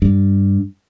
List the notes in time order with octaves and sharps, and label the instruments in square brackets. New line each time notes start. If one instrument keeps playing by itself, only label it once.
[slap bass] G2